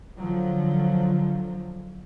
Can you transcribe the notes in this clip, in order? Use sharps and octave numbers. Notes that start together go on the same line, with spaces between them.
D3 F3 F#3